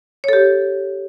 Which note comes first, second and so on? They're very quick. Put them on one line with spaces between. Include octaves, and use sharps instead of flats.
C#5 A4 G4